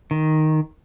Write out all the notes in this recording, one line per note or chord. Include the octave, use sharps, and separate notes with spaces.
D#3